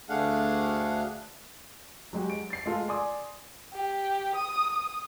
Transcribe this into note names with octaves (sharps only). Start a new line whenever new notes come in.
D2 A3 D4 G#4 F5 F#5
F#3 G#3 G4
D7
A6 C7
G#3 A3 F4 A4
D5 G#5 C6 D6 D#6
G4
D#6